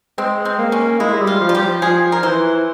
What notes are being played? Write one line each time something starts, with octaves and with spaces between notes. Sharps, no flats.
G#3 C4
C4
A#3
C#4
G#3 E4
G#3
G3
F4
F3
F4
G3 G4
F3
F3 G#4
A#4
E3 C5